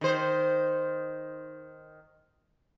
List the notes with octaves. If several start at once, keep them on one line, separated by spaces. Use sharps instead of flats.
D#3 C5